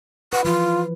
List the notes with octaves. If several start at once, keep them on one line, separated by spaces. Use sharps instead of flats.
B4 F#5
E3 F3 F4